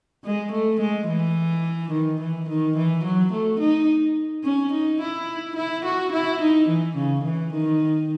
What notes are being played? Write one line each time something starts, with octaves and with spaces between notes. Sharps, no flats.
G#3
A3
G#3
E3
D#3
E3
D#3
E3
F#3
A3
D#4
C#4
D#4
E4
E4
F#4
E4
D#4
E3
C#3
E3
D#3